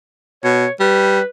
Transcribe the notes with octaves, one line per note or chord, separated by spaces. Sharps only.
B2 C#5
G3 B4